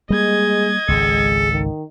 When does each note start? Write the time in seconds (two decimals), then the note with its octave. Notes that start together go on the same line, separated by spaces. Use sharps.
0.10 G3 G#3 A#3 D#5 G#6
0.88 G#1 C#2 G#3 A4
1.52 D#3